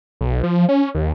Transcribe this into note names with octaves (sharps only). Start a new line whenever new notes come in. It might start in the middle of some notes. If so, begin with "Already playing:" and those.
B1
F3
C#4
D#2